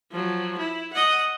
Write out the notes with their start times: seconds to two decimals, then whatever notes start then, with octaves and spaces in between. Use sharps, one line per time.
0.12 F3 F#3
0.58 E4
0.93 D#5 F#5